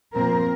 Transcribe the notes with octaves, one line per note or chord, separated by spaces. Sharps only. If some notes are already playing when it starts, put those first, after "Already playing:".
A#2 F3 C4 A#4